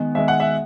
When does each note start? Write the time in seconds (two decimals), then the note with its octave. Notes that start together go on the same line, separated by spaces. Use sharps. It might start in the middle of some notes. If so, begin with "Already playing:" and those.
Already playing: D#3 G#3 B3
0.15 D#3 G#3 B3 E5
0.28 F#5
0.40 E5